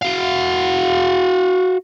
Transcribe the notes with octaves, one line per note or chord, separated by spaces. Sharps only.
F#4 F5